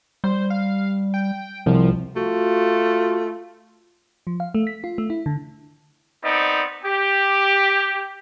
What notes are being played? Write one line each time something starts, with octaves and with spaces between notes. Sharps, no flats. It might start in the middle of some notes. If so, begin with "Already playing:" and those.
G3 C5
F5
G5
C2 F3
A3 F4 F#4
F3
F5
A3
B6
F4
A3
E4
D3
B3 C4 D#4 D5
G4